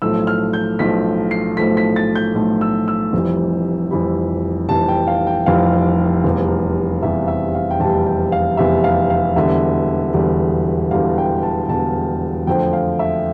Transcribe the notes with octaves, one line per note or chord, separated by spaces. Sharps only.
B1 A2 F3 A3 E6
F6
G6
B1 A2 F3 A3 B6
C7
B1 A2 F3 A3 B6
B6
A6
G6
B1 A2 F3 A3
E6
E6
F1 F2 E3 G3
F1 F2 E3 G3 B5
F1 F2 E3 G3 A5
G5
F5
G5
F1 F2 E3 G3 F5
F1 E2 C3 G3
F1 E2 C3 G3 E5
E5
F5
G5
F1 E2 C3 G3 A5
G5
F5
F1 E2 C3 G3 E5
F5
F5
E1 E2 D3 G3 E5
E1 E2 D3 G3
E1 E2 D3 G3 F5
G5
A5
E1 E2 D3 G3 A5
F2 D3 F3 A3 G5
F5
E5